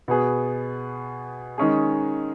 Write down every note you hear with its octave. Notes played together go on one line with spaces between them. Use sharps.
B2 B3 G#4
D#3 G#3 C#4 G#4